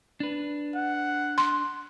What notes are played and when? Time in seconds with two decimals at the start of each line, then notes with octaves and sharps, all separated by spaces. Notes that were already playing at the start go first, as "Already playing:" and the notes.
0.20 D4 B4
0.75 F#5
1.38 C6